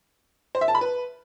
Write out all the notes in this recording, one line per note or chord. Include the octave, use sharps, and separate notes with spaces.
C5
E5
A5
B5
B4